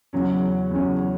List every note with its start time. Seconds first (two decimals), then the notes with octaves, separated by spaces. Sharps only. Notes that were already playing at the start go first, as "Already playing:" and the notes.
0.13 E2 C#3 F#3 C#4
0.71 E2 C#3 F#3 C#4